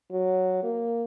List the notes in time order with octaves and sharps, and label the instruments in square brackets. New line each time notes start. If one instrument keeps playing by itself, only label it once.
[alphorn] F#3
A#3